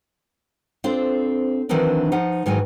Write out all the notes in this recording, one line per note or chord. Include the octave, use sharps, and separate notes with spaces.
C4 D4 F4 A4 C5
D#3 E3 F#3 C4 D4 D#4
F3 D#4 F#5
G#2 D#3 E3 F#3 G#5